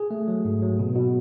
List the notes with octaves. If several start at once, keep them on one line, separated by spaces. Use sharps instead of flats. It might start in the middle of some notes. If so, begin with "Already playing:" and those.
Already playing: G#4
A3
F#3
G#2
F#3
B2
B2